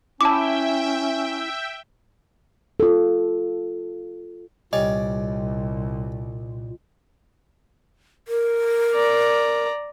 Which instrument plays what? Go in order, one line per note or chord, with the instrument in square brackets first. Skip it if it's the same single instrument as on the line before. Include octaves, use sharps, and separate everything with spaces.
[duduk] C#4 [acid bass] E4 [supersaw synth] E5 G5 [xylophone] A5 D6
[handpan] F4 A4
[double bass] C2 [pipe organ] A#2 [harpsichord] G3 C#4 D5 [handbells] D#5
[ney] A#4
[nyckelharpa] D5 A#5